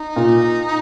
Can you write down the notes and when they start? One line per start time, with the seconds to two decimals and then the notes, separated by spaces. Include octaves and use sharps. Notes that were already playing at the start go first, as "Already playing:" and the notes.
Already playing: D#4
0.16 A#2